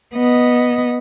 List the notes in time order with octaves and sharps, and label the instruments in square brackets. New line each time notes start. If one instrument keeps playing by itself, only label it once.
[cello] B3 D#5